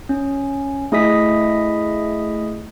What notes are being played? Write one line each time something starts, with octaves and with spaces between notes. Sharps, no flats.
C#4
A3 E4 G#4 D#5 D#6 B6